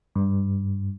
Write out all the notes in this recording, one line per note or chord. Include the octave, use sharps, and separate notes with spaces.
G2